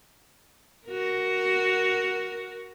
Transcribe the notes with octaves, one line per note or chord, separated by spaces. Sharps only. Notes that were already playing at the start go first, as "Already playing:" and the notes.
F#4 A#4